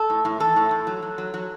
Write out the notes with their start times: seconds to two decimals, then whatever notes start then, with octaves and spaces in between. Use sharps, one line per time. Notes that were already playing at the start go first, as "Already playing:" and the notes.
Already playing: A4
0.10 A2
0.25 A2
0.40 E3 A4
0.56 A2
0.71 A2
0.87 F#3
1.02 F#3
1.18 F#3
1.34 F#3